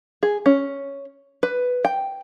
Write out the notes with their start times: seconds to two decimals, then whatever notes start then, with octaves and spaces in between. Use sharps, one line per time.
0.23 G#4
0.46 C#4
1.43 B4
1.85 G5